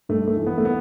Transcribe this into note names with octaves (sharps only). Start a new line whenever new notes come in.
G2 A3
A3
E3
B3
A3
B3